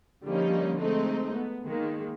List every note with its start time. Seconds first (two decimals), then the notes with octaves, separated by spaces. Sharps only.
0.24 D3 F3 G3 A#3 C#4 D#4
0.78 G#3 A3 C4 D#4
1.35 B3
1.64 D#3 G#3 A#3